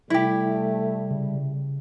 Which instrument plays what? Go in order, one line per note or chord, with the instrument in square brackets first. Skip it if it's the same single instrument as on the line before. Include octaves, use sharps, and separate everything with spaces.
[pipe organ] C3 G3 [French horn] A3 [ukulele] E4 G4
[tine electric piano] C#3